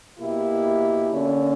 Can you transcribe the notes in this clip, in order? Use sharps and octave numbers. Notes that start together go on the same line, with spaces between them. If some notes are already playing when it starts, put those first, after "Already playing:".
B2 A#3 E4 G4
D3 A#3 C#4